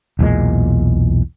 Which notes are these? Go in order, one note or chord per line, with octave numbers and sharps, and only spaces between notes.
B1 E2 A#2 G#3